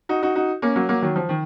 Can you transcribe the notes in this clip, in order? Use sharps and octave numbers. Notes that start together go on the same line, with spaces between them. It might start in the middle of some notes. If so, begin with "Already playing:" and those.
D#4 F#4
D#4 F#4
D#4 F#4
A#3 C#4
F#3 A#3
F#3 A#3
D#3 F#3
F3
D#3